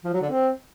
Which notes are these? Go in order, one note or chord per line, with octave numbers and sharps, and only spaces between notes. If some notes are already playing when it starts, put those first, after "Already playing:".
F3
F#3
D3
C4